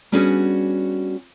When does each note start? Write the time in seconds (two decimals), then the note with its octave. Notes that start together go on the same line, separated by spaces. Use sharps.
0.12 G3 B3 C#4 D4 F#4 G#4